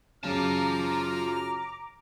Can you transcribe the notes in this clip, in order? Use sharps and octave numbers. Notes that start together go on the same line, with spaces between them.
F#2 C#3 F4 A5 A#5 D6 F6